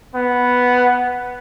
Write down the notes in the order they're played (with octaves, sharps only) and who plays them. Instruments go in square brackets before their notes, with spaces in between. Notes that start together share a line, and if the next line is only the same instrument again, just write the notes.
[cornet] B3